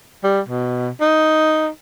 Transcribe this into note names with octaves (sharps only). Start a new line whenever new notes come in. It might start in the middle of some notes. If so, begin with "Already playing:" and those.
G3
B2
D#4